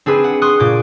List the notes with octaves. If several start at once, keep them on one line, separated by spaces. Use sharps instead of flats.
C4 D4 G#4 B4
F#5
C6 C#6 D#6 F#6
A#2 D6 G6